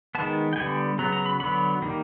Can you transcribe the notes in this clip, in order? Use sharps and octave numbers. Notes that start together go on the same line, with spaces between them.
D#3 G#3 B3 A5
G5
D3 G3 B3 G#5
C#3 F#3 B3 A#5
A#5
B5
D3 F#3 B3 B5
D#3 G3 A#3